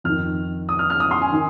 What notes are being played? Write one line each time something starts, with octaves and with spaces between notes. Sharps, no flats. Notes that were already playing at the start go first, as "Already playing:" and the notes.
F2 D#3 F6
D#6
F6
F6
D#6
C6
G#5
D#3